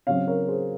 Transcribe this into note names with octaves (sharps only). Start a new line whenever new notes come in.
C#3 F#3 C4 C#5 F5
A#4 C#5
G#4 C5